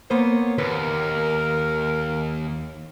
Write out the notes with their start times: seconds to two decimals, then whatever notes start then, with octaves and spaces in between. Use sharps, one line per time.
0.10 A#3 B3 C5 C#5
0.58 D#2 A#4 B4